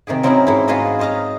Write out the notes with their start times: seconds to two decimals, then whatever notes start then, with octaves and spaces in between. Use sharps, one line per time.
0.07 C3 D#3 G4 G#4
0.23 F#3 C4 C#4 D#4 E4 F#5
0.47 G#2 E4
0.68 F4 F#4 G#4 B4 D#5 A#5
0.99 C5 C#5 D#5 F5 A#5